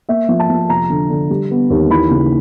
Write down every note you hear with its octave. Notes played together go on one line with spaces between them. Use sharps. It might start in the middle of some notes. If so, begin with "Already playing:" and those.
A#3 E5
F3
A5
F3
F1 A#5
D3
D3
G3
B3
D#2
E3 B5
C#3